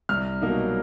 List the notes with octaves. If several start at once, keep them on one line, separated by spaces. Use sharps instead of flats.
C2 F6
B2 F#3 A#3 D#4